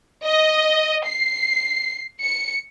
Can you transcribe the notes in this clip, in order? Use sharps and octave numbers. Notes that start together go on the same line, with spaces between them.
D#5
C7
C#7